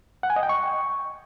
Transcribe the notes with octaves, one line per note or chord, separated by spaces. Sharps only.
F#5
G#5
D#5
G5
C#6